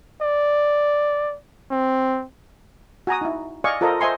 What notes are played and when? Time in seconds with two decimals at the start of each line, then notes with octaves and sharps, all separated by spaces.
0.22 D5
1.71 C4
3.07 F#4 G#5 A#5 D#6
3.21 D#4 E4
3.64 D5 D#5 F5 G#5 C#6
3.81 F4 A4 A#4 C5 D#5
4.00 C5 D#5 E5 G#5 C6 C#6